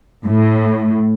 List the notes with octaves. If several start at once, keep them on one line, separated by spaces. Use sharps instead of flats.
A2